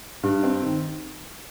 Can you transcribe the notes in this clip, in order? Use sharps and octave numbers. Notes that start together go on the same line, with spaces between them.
G2
C4
D#3